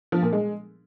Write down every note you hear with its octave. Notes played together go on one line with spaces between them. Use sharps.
F3
A#2
G#3